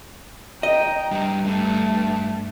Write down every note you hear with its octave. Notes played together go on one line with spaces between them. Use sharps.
D#5 G5 A#5
G2
G2 A3